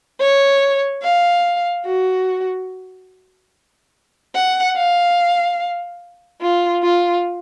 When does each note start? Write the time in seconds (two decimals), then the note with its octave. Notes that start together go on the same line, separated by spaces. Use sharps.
0.20 C#5
1.04 F5
1.86 F#4
4.35 F#5
4.77 F5
6.41 F4
6.83 F4